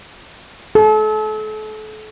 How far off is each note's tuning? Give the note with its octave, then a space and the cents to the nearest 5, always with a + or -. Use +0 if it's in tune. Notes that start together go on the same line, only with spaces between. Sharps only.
A4 -35